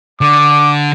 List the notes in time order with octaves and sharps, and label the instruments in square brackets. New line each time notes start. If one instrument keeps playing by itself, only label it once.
[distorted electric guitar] D3 [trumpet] D6